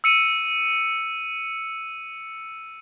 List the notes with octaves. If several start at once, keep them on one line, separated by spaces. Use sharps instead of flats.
E6 C#7 D#7